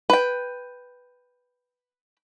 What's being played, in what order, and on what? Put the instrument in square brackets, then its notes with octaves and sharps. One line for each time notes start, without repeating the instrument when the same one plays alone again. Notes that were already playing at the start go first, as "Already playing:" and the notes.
[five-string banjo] B4 G5